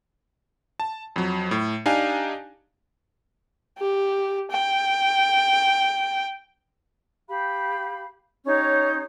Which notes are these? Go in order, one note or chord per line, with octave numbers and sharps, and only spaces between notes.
A5
F2 F#3
A2
D4 D#4 G4 F5 G#5
G4
G5
G4 F5 B5
C#4 D#4 G4 C#5